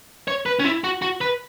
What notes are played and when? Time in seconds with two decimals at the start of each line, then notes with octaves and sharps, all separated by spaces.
0.28 C#5
0.46 B4
0.59 C#4
0.64 E4
0.84 F#4
1.02 F#4
1.21 B4